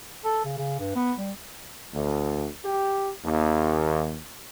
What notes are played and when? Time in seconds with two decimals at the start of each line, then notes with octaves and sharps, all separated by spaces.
0.25 A4
0.45 C#3
0.58 C#3
0.80 G2
0.95 B3
1.18 G3
1.94 D2
2.64 G4
3.25 D#2